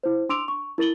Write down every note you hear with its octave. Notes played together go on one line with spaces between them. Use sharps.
E4 C5
D4 C6 D6 E6 D7 F7
C#6
E4 A#4 A6 F#7 G7